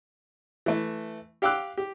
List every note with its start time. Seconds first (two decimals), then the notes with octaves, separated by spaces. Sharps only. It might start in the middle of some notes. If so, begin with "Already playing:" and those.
0.66 E3 A3
1.42 G4 F5 G5 D6 E6 F#6
1.77 G4